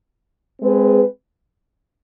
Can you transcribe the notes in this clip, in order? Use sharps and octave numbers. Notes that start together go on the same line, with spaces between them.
G#3 C4 G#4 B4